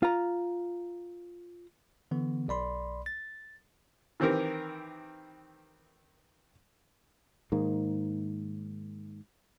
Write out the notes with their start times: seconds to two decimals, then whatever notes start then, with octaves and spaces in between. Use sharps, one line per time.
0.03 F4 A#5
2.11 D3 E3 B3
2.48 B1 D5 B5 C6
3.06 A6
4.20 D#3 E3 C4 G4 A#4
7.52 G#2 D#3 A#3